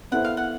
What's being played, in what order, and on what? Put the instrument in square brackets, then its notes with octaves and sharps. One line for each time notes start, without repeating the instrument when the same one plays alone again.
[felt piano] B3 E4 A4 C5 [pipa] F#5
[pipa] F5
F#5